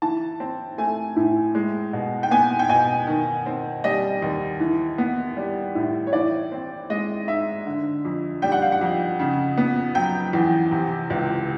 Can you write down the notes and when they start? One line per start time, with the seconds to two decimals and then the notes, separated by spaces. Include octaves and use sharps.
0.02 E3 A5
0.40 C4
0.78 A3 G#5
1.16 A2
1.55 G#3
1.93 B2
2.23 G5
2.31 B3 G#5
2.59 G5
2.69 B2 G#5
3.07 D#3
3.46 C4
3.84 G3 D#5
4.22 D#2
4.60 E3
4.98 B3
5.37 G3
5.75 A2
6.07 C#5
6.13 E3 D5
6.52 C4
6.90 G#3 D#5
7.27 G#2 E5
7.66 D3
8.05 F2
8.42 G3 G5
8.52 F#5
8.62 F5
8.72 F#5
8.81 F2
9.19 C#3
9.58 B3
9.95 F#3 G5
10.33 E2
10.72 C3
11.10 C#2